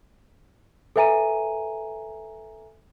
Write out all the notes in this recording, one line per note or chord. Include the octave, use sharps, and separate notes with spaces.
A4 B4 E5 G#5 A#5 D#7